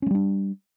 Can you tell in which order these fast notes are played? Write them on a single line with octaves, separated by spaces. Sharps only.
C#4 G#3 G3 D4